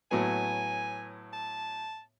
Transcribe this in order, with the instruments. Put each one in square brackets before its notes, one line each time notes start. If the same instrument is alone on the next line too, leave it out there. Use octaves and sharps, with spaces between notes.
[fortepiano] A2 F#3 B3 [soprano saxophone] G#5
[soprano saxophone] A5